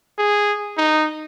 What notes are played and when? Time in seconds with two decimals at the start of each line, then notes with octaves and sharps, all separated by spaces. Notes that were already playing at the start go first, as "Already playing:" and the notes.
0.19 G#4
0.78 D#4